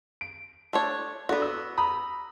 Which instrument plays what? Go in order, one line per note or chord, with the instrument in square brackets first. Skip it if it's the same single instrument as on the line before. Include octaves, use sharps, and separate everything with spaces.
[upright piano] D7
[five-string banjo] A3 D4 C#5
[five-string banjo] B3 F#4 [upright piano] D4 A4
[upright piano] E6
A#5 B5 D#6